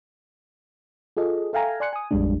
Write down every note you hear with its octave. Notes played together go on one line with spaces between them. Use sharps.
F4 G#4 A4 D#5
A4 E5 F5 G5 G#5 A#5
D5 G#5 C6 F#6 C#7
G#5 D#6
A1 F2 G3 G#3 D4